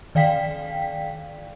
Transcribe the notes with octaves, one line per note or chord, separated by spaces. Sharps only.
D#3 D5 F5 G5 B6